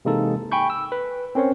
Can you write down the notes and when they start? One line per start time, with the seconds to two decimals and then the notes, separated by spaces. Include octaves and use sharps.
0.05 C3 E3 G#3 A#3 D#4 A4
0.52 G5 G#5 B5 C#6 G6
0.70 E6
0.92 B4
1.35 C4 C#4 A#4 C5 C#5